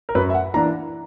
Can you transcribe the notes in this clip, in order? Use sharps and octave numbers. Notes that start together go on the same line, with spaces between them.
A#4
F#2 B4
E5
F#5
E3 A#3 D4 A#5